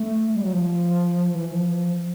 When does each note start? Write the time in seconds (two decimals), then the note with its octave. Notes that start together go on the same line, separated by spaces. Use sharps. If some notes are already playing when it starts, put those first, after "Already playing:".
Already playing: A3
0.34 G3
0.44 F#3
0.53 F3
1.35 E3
1.53 F3